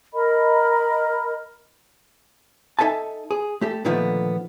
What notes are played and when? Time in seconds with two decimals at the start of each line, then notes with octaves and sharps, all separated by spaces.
0.14 A#4 D#5 B5
2.79 D#4 A4 E5 G#5 A5
3.31 G#4
3.61 A3 G4 A4
3.85 A#2 D3 D#3 F3 A3 B3